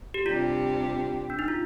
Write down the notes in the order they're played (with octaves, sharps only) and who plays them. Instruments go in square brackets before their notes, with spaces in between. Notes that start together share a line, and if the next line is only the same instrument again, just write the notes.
[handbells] G4
[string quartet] C3 G3 D4 G4 [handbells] F4
[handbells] D4
D#4
F4